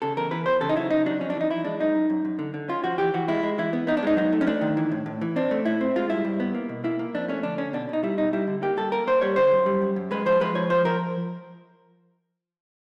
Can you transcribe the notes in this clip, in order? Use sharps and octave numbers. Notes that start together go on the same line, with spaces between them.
C#3 A4
E2 A#4
E3 B4
E2 C5
C#3 A4
D#4
F#3 E4
C#3 D#4
F#3 D4
F2 C#4
D4
E3 D#4
E3 E4
G#3 D4
F#2 D#4
F#2
F#2
F#2
D3
D3
C#4 F4
F3 F#4
E3 G4
E3 F#4
G#3 E4
G#3
E3 E4
B3
B3 D#4
D4
G#3 D#4
F#3 D#4
A3
C#4
A3 D4
D#3
E3
A2
A2
E3
C4 D4
A3
A2 E4
C4
G#3 F4
G2 E4
G2
B3
A#3
B2
A#3 E4
A#3
F2 D4
A3 C#4
D3 D4
D3 C#4
B2 D4
B2 D#4
G3 E4
B2 D#4
G3 E4
D3
A#3 G4
G3 A4
A#3 A#4
A#3 C5
G3 C#5
D3 C5
F#2
G3
F#2
F#2
G#3 B4
F3 C5
G#3 B4
F3 C#5
F3 C5
F3 A#4